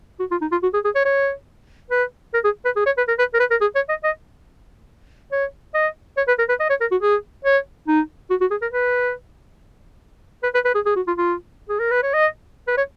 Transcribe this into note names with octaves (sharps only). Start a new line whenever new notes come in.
F#4
F4
D#4
F4
F#4
G#4
G#4
C#5
C#5
B4
A#4
G#4
B4
G#4
C#5
B4
A#4
B4
A#4
B4
A#4
G#4
C#5
D#5
D#5
C#5
D#5
C#5
B4
A#4
B4
D#5
C#5
A#4
F#4
G#4
C#5
D#4
F#4
F#4
G#4
A#4
B4
B4
B4
B4
G#4
G#4
F#4
F4
F4
G#4
A#4
B4
C#5
D#5
B4
C#5